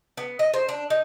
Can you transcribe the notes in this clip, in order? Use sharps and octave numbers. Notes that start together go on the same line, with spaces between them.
B3
D#5
C5
D4
D#4